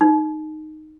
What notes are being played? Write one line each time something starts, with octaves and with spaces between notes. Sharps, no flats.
D#4